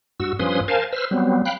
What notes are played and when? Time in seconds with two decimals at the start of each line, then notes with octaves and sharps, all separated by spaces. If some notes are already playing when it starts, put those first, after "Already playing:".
0.20 G2 F#4 E6
0.39 G2 F3 C#4 B4 C6 D#6
0.68 A#4 C5 F5 G#5 A5
0.93 B4 C5 E6 F6
1.11 F#3 G3 B3 C4
1.45 F5 G5 B5 F#6